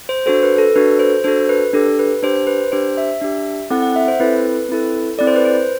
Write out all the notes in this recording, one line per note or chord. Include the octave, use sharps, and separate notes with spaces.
C5
D4 F#4 A4 C5
B4
A4
D4 F#4 A4 B4
C5
D4 F#4 A4 C5
B4
D4 G4 A4
B4
D4 G4 C5
C5
B4
D4 G4 C5
E5
D4 G4
C4 E4 A4 F#5
F#5
E5
C5
C4 E4 A4 B4
C4 E4 A4
C4 E4 A4 D5
C5
B4
C5